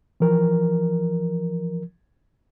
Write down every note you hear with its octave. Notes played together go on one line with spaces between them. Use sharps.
E3 F3 A#4